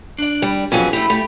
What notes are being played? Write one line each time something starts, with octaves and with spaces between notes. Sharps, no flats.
D4 D5
G3
F2 F#3 C#4 G#4 B4 G#5
A3 E4 G4
A3 G4